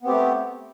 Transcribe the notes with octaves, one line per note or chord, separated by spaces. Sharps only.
A3 B3 C4 G4